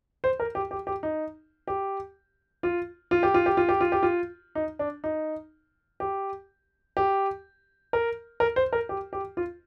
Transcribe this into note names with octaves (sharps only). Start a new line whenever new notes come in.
C5
A#4
G4
G4
G4
D#4
G4
F4
F4
G4
F4
G4
F4
G4
F4
G4
F4
D#4
D4
D#4
G4
G4
A#4
A#4
C5
A#4
G4
G4
F4